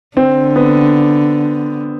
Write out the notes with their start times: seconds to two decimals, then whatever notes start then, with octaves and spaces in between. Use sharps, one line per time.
0.17 D3 C4
0.56 B3